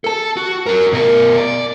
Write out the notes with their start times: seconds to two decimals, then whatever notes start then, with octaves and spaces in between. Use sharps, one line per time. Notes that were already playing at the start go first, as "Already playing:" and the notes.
0.04 A4 A5
0.37 F#4
0.66 F#4 A#4
0.93 B2 A#4
1.37 D5